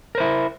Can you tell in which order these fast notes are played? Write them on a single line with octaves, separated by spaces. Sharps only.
A#4 C5 E4